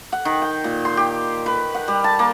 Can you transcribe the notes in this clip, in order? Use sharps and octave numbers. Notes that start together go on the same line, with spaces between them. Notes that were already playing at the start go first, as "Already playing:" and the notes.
F#5
D#3
G5
A#2
C6
G4
B4
F#5
G3
A5
A#3